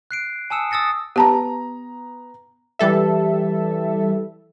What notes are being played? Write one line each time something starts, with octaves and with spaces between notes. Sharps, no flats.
F#6 C7 D7
G#5 A5 D#6 E6 C#7 E7
D#6 E6 A6 A#6 C#7
B3 G4 A5 A#5
E3 G3 A4 E5